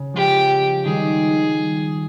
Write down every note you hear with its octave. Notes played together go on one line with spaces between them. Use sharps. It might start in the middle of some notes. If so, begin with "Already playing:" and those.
Already playing: C#3
F3 G#3 G4
D#3 G3 G#4